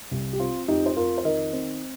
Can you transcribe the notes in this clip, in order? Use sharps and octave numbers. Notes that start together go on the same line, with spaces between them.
C2
G4
C4 F4
F2 D#4 G4
C5
F2 F4 A#4
C5
D#3 A#4 D#5
C4